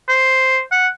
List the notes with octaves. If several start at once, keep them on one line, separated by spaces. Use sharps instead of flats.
C5
F#5